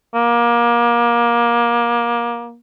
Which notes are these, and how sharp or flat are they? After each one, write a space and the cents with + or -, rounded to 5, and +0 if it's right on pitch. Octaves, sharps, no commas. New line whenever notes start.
A#3 +25